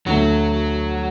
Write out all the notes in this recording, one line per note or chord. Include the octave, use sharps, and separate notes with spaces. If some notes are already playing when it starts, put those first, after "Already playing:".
D2 D3 F#3 A3 F#4